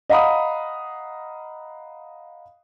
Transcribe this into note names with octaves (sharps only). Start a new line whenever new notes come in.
D#5 F5 F#5 A#5 B5 D#6